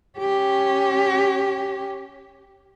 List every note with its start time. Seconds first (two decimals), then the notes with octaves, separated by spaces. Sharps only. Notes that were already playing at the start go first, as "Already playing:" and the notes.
0.19 C#4 G4